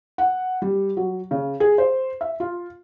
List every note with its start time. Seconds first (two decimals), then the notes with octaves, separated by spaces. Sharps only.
0.18 F#5
0.62 G3
0.97 F#3
1.31 C#3
1.60 G#4
1.78 C5
2.21 E5
2.40 F4